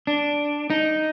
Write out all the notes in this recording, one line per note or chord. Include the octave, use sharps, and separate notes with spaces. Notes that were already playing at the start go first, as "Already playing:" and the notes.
D4
D#4